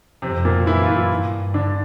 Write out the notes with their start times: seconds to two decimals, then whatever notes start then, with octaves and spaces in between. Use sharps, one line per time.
0.22 F2 C3 C4
0.45 A#2 A#3
0.66 F#2 E3 E4
0.83 F4
0.88 E3 E4
1.10 G2
1.54 D3 D4